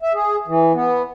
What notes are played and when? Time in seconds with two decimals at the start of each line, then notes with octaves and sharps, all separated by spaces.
0.02 E5
0.14 G#4
0.47 E3
0.74 B3